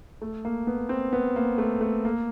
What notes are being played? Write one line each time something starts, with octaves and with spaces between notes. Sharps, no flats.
A3
A#3
B3
C4
B3
A#3
A3
A3
A#3